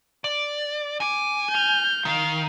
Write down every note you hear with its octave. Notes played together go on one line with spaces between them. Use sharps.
D5
G#5 D6
F6 G6
D#3 F5